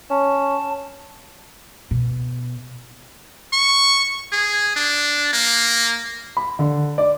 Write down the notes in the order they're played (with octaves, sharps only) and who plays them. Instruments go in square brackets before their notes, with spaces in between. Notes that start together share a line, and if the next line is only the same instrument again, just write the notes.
[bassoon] C#4 [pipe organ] A5
[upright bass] B2
[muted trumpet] C#6
G#4
D4
A#3
[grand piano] B5
D3
D5